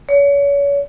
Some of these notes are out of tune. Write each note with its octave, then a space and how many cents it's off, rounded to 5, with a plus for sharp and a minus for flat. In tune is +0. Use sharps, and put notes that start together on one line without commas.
C#5 +35